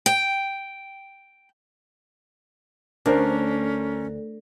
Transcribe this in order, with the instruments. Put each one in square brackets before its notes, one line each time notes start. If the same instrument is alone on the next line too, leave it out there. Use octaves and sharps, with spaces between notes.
[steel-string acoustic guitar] G5
[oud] D2 [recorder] C#4 [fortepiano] D4 A#4 C5